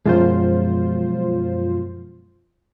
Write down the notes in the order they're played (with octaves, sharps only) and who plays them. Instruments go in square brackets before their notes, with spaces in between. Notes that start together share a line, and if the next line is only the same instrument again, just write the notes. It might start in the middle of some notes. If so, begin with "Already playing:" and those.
[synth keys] F#2 F4 C5 [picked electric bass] B2 F3 G#3